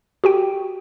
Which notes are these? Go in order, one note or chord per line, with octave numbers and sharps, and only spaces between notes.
F#4 G4 G5